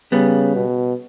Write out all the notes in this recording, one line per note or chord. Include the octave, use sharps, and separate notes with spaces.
C#3 G3 B3
B2